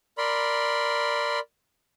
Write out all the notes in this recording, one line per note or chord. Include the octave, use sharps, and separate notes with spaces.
A#4 D5 B5 C6